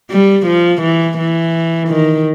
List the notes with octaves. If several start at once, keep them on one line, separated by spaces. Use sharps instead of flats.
G3
F3
E3
E3
D#3